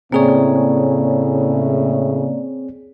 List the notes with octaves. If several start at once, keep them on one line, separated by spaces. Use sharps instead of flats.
A2 C#3 A#3 C4 G#4 C#5 D5